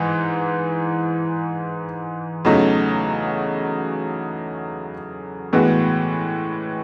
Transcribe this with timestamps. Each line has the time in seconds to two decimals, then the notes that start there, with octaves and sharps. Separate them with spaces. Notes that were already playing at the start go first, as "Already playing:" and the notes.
Already playing: G#2 E3 G#3
2.45 E2 C#3 F#3 A3 D#4
5.53 A2 E3 G#3 B3 F#4